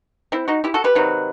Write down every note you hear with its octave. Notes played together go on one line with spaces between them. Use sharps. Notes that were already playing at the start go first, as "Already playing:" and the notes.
C4 E4
D#4 F#4
E4 G4
F#4 A4
G4 B4
C3 D#3 F#3